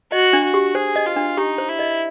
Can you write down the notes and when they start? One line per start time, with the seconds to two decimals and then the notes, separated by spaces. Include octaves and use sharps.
0.12 F#4 D#5
0.33 D4
0.44 F#4
0.54 G4
0.75 G#4 C5
0.96 D#5
1.06 F4
1.16 D4
1.37 D#4 G4
1.58 C5
1.69 E4
1.79 D#5